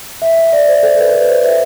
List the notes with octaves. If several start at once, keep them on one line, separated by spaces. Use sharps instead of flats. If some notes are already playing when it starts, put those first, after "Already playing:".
E5
E5
D5
C5
A4
B4
B4
C5
E5